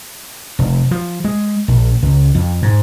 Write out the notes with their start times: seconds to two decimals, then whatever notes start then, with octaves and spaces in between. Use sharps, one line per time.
0.59 F1
0.91 F3
1.24 G#3
1.68 A#1
2.02 C#2
2.35 F2
2.62 G#2